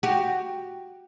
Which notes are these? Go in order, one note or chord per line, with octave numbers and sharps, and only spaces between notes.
F#4 G4